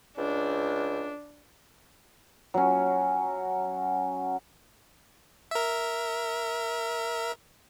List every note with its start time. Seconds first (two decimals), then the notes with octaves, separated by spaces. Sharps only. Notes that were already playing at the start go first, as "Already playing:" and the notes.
0.18 C#2 D4
2.54 F#3 C#4
5.51 A#4 E5